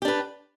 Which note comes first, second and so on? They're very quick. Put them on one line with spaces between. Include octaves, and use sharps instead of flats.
G4 D4 B4